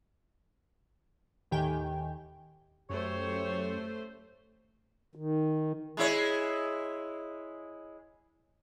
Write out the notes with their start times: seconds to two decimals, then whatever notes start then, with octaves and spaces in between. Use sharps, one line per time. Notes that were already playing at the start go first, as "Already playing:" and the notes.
1.51 D#2 A2 D#3 G4 G5 G#5
2.90 F#2 A3 G4 C5 C#5
5.15 D#3
5.97 G#3 E4 C#5